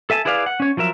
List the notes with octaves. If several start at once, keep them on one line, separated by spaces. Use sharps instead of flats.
A4 E5 G#5 A5
E4 G#4 B4 D5 F5
F#5
C#4 C#5
F3 F#3 A#4 E5